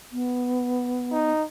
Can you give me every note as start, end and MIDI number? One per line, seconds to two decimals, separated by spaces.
0.12 1.31 59
1.12 1.44 63